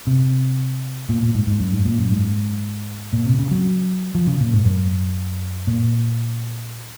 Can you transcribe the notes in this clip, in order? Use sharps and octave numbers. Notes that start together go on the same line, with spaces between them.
C3
A#2
A#2
G#2
G#2
F#2
G#2
A#2
F#2
G#2
A#2
C3
C#3
F#3
F3
C#3
A#2
G#2
F#2
A#2